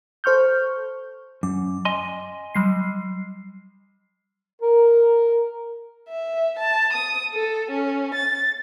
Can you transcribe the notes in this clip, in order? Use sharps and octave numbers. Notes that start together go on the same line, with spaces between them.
A4 C5 C#6 F6 G6
F#2 D6
D#5 G#5 C6
F#3 G3 C7
A#4
E5
A5
D#6
A4
C#4
A6